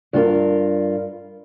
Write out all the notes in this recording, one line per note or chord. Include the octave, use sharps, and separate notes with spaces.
G2 F4 F#4 A#4